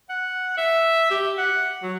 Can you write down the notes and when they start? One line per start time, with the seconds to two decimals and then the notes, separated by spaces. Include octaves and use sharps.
0.10 F#5
0.58 E5
1.11 G4
1.38 F#5
1.83 F#3